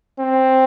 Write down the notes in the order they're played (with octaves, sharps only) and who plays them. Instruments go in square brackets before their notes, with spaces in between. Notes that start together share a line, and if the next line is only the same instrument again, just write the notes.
[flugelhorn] C4